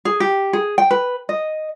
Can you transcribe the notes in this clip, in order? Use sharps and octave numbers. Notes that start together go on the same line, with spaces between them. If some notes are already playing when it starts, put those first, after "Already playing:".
G#4
G4
G#4
G5
B4
D#5